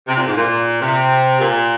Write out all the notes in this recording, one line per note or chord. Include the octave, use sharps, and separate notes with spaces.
C3
A#2
G#2
A#2
C3
A#2